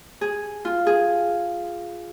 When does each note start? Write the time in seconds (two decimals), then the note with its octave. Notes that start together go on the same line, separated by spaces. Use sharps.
0.21 G#4
0.65 F4
0.87 G#4